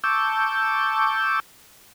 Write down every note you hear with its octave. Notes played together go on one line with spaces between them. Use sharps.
A5 C#6 D6 E6 G6